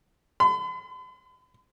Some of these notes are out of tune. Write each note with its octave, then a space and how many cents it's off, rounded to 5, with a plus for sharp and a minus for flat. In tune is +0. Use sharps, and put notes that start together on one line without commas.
B5 +45